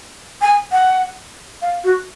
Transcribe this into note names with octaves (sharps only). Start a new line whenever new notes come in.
G#5
F#5
F5
F#4